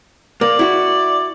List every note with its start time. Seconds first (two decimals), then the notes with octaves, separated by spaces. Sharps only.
0.41 A#3 D5
0.59 E4 F#4